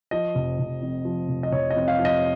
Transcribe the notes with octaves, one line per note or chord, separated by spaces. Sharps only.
F3 D#5
F1
F1
F2
F3
F1
D#5
F1 C#5
D#5
F2
F5
F3
D#5